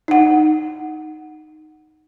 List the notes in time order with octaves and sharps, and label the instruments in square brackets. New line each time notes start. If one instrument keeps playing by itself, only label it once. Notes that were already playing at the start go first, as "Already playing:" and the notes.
[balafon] D#4 F#5